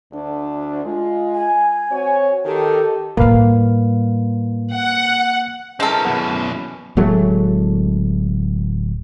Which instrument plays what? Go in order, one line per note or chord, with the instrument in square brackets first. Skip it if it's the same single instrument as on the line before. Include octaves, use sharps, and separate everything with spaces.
[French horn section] D2 D4
G#3 F4
[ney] G#5
[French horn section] C4 F#4 C#5
[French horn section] D#3 A4 [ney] G4
[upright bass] A2 G3 [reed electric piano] A#3 B4 F5
[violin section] F#5
[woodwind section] E3 C#4 [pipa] G#3 A4 [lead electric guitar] C4 A#4
[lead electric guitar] F#2 B2 [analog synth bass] B3
[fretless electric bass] D1 F#3 G#3 A3